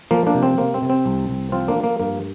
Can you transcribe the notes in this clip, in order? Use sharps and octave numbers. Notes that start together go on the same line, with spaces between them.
F3 A#3
A#3 D4
C3
C4
C3 A#3
C4
C3
C4
C2
C2
F3 C4 F4
A#3 D4
F3
A#3
G2 A#3